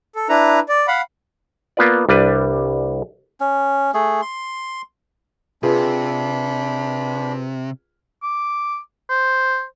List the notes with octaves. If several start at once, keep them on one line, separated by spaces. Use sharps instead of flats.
A4
D4 E4 B4 A#5
D5
F5 F#5 B5
A#3 B3 F4 B4 D5
C2 G3 D4 B4
C#4
A3 G#4
C6
C3 D4 F4 G#4 B4 B5
D6
C5